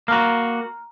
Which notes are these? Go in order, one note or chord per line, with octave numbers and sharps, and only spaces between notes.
A#3 F#4 A#5 F6